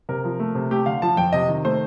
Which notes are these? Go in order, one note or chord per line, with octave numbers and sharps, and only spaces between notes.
C3 A#4
F3
A3
C3
A3 G4
D3 F5
F3 A5
F2 G5
C3 D#5
D#3
A3 C5